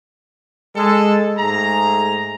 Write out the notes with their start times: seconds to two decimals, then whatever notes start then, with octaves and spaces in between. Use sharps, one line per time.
0.75 G#3 A4
1.37 G#2 A3 G#4 A#5